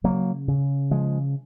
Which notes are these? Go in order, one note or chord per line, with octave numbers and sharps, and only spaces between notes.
C#3 F#3 A#3
C#3
C#3 F3 G#3